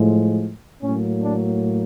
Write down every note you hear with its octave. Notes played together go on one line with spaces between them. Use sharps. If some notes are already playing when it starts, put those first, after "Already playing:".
Already playing: A2 F3 G#3
A2 F#3 A#3 C#4
D4